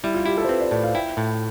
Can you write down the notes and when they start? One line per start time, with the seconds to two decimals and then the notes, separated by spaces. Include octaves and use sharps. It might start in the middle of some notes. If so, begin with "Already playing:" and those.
0.04 G3 E4
0.14 F4
0.26 E4 G4
0.38 A4
0.45 C5
0.49 C4 B4
0.61 D5
0.71 A2 D5
0.84 F5
0.95 E4 G5
1.17 A2